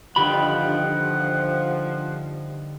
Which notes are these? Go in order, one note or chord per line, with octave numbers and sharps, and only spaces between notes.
G2 D3 D#3 F3 G4 F#5 B5